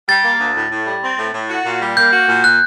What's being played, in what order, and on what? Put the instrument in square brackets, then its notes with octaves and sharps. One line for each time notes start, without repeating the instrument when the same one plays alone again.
[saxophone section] G3 [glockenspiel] A6
[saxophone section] A#3
D2
A2
A2
G3
C4
A2
A2
F#4
A#2
G3
[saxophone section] A#3 [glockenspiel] G6
[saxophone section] F#4
A#2
[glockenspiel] F#6